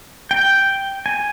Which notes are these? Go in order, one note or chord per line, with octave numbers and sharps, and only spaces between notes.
G5
G#5